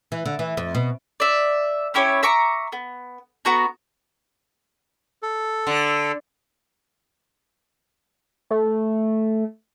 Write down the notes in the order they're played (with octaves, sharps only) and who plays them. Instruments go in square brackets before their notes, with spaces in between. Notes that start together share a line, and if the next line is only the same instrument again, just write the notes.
[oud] E3
D3
E3
F2
B2
[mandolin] D5 E5
C#4 E4 G4 C#5
E5 A#5 C#6 D6
B3
B3 F#4 A#5
[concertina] A4
[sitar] D3
[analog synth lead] A3